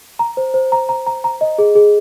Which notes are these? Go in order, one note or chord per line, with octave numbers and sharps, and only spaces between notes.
A#5
C5
C5
A#5
A#5
A#5
A#5
D#5
G#4
G#4